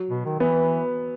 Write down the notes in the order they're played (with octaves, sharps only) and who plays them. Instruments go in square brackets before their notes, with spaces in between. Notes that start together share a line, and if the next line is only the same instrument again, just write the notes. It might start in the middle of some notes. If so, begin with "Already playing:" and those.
Already playing: [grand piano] F#3
[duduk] B2
D#3
[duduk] E3 [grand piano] B3